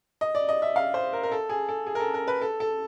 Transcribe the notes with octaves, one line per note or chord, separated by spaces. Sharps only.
D#5
D5
D#5
E5
F5
C5
A#4
A#4
A4
G#4
A4
G#4
A#4
A4
A#4
B4
A4
A4